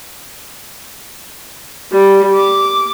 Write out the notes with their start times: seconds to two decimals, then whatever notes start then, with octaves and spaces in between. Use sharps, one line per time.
1.92 G3
2.35 D6